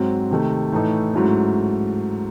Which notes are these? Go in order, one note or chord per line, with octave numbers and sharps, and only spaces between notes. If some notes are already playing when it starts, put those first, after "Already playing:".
Already playing: G#2 F#3 C4
C3 D#3 A3
A2 E3 A3 D#4
G#2 F#3 A3 C#4 E4